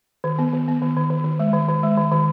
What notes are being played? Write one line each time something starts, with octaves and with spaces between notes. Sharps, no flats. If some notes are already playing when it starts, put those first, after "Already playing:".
D#3
B3
D#3
B3
D#3
D#3
D#3
D#3
G#3
D#3
D#3
G#3
D#3
D#3